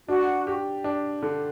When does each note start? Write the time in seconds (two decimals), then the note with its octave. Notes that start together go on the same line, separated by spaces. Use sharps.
0.08 D4 F#4
0.47 G4
0.84 D4
1.22 D3